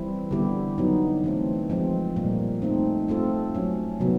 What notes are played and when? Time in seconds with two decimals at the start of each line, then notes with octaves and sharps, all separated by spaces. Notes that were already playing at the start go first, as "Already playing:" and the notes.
Already playing: E3 G3 C4 E4
0.31 D3 G3 B3 E4 G4
0.78 D3 F#3 B3 D#4
1.24 E3 A3 C4
1.70 F3 G#3 C4
2.16 A#2 G3 A#3
2.62 A3 C4 D#4
3.08 A3 C4 F4 A4
3.55 F#3 A3 C#4
4.00 C3 D#3 F#3 B3